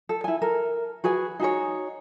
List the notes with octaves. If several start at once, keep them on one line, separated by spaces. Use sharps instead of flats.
A4
E4 G#5
A4 A#4
F#4 G#4 B4 G#5
D#4 F#4 G#4 C#5